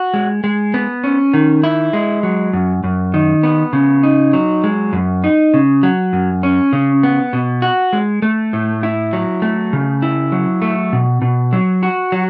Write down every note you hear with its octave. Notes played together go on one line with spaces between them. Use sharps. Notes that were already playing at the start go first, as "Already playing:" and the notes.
Already playing: F#4
G#3
G#3
B3
C#4
D#3
E4
G#3
F#3
F#2
F#2
D#3
B3
C#3
D#4
F#3
G#3
F#2
D#4
C#3
F#3
F#2
C#4
C#3
B3
B2
F#4
G#3
A3
A2
E4
F#3
A3
C#3
E4
F#3
A3
B2
B2
F#3
F#4
F#3